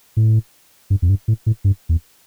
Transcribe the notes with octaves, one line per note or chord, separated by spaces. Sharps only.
A2
G2
F2
G2
A2
A2
G2
E2